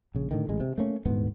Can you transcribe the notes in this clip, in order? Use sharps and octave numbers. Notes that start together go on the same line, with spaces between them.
A#1 C#3
A2 D3 D#3
A1 G#3
C3
A3 A#3 C#4
D#1 D2 G#2 B3